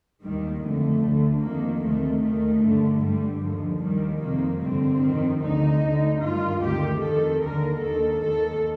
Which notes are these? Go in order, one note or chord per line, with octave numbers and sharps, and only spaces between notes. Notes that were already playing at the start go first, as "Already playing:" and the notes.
D#2 D#3 G3
F2 D3 A3
D2 D3
F2 D#3 A#3
D2 C3 D#3 A3
D#2 D#3 A3
G2 D3
G2 D3 G3
D#2 D3 F3
D#2 D#3 G3
F2 C3 D#3 A#3
G2 D3 C4
F2 C3 D#3
D2 D3 D#4
D2 D3
G2 D#3 F4
D2 C3 D#3 G4
F2 D#3 A4
D#2 D3 A#4
D#2 D#3 A4
D#2 D#3 A4